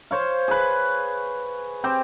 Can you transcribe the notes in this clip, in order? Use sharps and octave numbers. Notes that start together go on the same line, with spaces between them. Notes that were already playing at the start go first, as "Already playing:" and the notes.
C5 C#5 F5
G#4 B4
C4 G4 C5